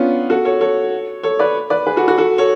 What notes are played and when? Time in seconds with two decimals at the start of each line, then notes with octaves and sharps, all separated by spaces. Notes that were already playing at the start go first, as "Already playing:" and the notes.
Already playing: B3 C#4 D4 F4
0.30 F#4 A4
0.45 A4 C#5
0.61 A4 C#5
1.23 A4 C#5
1.39 B4 D5
1.70 B4 D5
1.87 G#4 B4
1.96 F#4 A4
2.08 F#4 A4
2.18 F#4 A4
2.38 A4 C#5